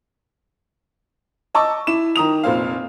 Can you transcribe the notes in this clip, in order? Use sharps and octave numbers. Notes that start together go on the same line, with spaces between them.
D#5 A5 C#6 D6 E6
E4 E7
D#3 A#5 D#6 F7
F1 A#2 C5 F5